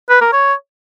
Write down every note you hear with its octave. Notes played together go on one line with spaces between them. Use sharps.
B4
A#4
C#5